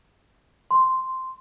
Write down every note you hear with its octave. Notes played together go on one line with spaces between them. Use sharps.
C6